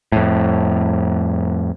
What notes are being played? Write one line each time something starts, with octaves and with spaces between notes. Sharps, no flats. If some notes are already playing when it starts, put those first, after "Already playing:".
F2 A2